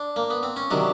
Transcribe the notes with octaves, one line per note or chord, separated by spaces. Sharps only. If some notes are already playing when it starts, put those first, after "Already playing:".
Already playing: D4
A#3
B3
C4
C#4
C3 D#3 F#3 D4